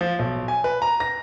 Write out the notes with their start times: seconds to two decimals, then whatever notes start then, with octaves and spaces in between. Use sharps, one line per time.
0.01 F3
0.19 B1
0.48 G#5
0.64 B4
0.82 A#5
1.00 A#6